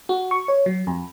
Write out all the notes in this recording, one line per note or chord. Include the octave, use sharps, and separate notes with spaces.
F#4
C#6
C#5
F#3
F2